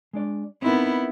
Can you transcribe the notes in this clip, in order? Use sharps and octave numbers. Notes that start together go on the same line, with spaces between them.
G#3 D4 D5
B3 C4 D#4 E4 A#4